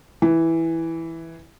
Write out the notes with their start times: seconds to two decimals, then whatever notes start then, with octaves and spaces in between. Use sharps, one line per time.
0.22 E3